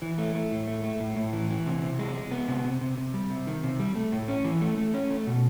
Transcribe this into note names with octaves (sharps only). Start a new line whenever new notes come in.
E3
A3
A3
A2
A3
A3
A2
A2
E3
E3
C3
C3
G#3
G#3
B3
C3
C3
C3
C3
G3
C3
D#3
C3
G3
A3
A2
C#4
E3
A3
A3
C#4
A3
B2